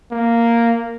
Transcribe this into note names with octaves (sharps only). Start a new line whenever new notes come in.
A#3